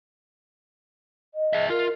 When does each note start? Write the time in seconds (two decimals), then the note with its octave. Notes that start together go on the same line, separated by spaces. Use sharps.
1.34 D#5
1.53 G#4 E5
1.69 F4 A#4